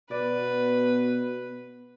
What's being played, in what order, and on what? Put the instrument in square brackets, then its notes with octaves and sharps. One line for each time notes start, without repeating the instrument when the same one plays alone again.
[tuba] B2 [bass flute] B3 [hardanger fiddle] B4 [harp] D5